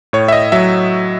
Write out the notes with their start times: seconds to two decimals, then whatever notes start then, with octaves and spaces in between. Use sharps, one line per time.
0.13 A2 C#5
0.28 E5
0.32 D#5
0.52 F#3 E5